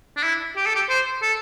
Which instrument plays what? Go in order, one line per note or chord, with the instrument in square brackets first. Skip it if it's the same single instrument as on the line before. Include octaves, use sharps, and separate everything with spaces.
[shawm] D4
E4
G4
A4
G4
C5
A4